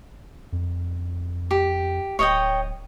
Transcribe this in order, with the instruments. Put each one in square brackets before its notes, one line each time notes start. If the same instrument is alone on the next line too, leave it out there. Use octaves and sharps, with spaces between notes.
[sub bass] F2
[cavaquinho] G4
[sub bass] D1 [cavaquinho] C#5 D#5 G5